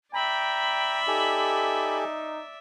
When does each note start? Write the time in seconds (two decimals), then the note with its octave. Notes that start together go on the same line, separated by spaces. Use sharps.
0.14 D5 E5 G5 A#5 B5
1.08 D#4 G4 A4 G#5